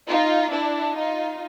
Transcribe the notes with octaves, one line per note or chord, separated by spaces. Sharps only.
D#4 F4
D4 E4
D#4 F4